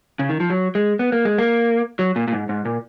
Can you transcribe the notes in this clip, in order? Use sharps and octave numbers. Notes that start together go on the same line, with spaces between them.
C#3
D#3
F3
F#3
G#3
B3
A#3
G#3
A#3
F#3
A#2
A#2
G#2
G#2
A#2